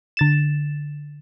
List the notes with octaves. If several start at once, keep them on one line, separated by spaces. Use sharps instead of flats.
D3 A6 E7